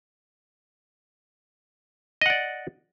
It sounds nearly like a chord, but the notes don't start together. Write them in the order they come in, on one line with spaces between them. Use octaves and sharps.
D#5 F#5 D5